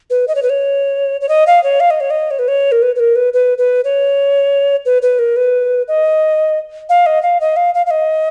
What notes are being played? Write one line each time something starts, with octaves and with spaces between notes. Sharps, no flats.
B4
D#5
C#5
B4
C#5
C#5
D#5
F5
C#5
F5
D#5
C#5
D#5
C#5
B4
C#5
A#4
B4
B4
A#4
B4
B4
B4
C#5
B4
B4
A#4
B4
D#5
F5
D#5
F5
D#5
F5
F5
F5
D#5